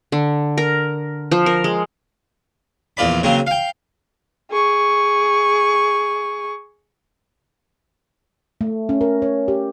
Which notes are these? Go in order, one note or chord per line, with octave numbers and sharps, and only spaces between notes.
D3
A#4
F3
A#4
G#3
A#1 E2 F4 D5 B5
C#3 F#3 A#3 C4
F5 G5
G#4 C#6
A3
C#4
A#4
C#5
G4